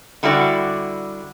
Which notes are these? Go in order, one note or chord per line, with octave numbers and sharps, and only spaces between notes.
D3 G3 E4 F#4 D5